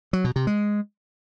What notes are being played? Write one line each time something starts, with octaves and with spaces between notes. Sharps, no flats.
F#3
B2
C3
G#3